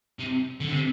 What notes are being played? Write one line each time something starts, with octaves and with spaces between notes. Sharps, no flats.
C3
D3
C3